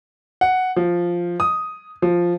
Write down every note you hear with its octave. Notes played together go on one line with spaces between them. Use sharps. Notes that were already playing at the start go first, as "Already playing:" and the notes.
F#5
F3
D#6
F3